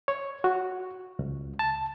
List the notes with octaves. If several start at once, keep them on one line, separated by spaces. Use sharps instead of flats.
C#5
F#4
C#2
A5